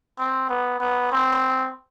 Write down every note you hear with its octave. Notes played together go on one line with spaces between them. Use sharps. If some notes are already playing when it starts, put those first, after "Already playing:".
C4
B3
B3
C4